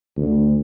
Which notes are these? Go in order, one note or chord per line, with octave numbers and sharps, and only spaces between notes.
D2